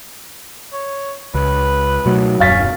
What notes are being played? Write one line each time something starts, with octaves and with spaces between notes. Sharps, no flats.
C#5
C#2 B4
B2 F#3 A3
D#1 F#2 C#4 F5 A6 B6